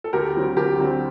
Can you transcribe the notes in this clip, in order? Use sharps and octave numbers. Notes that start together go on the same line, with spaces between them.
A4
D2 G4 A#4
D3 F#3 C4
D2 G4 A#4
D3 F#3 C4